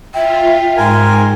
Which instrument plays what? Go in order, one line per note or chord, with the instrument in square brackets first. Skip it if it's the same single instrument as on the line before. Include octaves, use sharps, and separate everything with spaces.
[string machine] F4 [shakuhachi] E5 [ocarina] G5
[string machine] G#2 [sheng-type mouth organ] A#4 G#5 [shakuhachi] C6